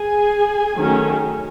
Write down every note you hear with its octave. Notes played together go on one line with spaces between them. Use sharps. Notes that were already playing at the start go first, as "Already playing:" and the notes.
Already playing: G#4 G#5
D#3 F#3 A3 C#4